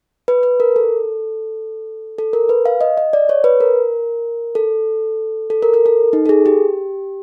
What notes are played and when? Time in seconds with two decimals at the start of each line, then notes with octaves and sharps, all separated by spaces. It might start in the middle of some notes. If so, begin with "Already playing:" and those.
0.28 B4
0.43 B4
0.60 A#4
0.76 A4
2.18 A4
2.33 A#4
2.49 B4
2.65 F5
2.81 D#5
2.97 D#5
3.13 D5
3.29 C#5
3.44 B4
3.61 A#4
4.55 A4
5.50 A4
5.63 A#4
5.74 A#4
5.86 A4
6.13 D#4
6.26 A4
6.29 G#4
6.46 G4